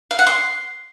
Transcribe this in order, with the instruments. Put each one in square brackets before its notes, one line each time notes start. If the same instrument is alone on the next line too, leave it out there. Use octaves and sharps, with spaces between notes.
[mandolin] F5
F#5
C6